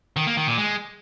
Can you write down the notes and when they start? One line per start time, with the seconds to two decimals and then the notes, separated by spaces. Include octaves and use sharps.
0.16 D#3
0.27 A#3
0.37 D#3
0.47 A#2
0.58 G#3